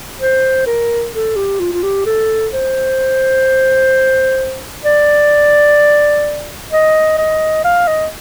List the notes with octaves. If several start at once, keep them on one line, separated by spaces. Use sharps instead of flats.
C5
A#4
A4
G4
F4
F4
G4
A4
C5
D5
D#5
D#5
F5
D#5